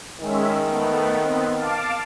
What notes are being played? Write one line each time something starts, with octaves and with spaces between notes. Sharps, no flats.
D#3 G#3 C#4 E5
A3 B3
B3 C4
F5 A5 D6